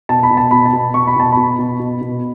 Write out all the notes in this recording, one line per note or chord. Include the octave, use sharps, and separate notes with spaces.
B2 A5
B5
B2
A5
B2 B5
A5
B2
B2 C#6
B5
B2 A5
B2 B5
B2
B2
B2